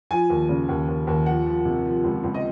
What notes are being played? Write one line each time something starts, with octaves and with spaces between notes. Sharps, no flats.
F3 G#5
D#2
C#3
D#2
D#2
D#2
F3 F#5
F3
C3
F3
C#2
C#2
D#5